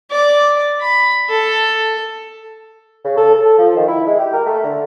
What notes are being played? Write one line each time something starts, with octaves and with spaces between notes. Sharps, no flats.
D5
B5
A4
C#3
A4
A4
F3
D#3
E4
G#3
G4
A#4
A3
D3